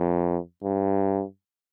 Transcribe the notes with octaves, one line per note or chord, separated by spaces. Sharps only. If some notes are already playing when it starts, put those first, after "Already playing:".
Already playing: F2
G2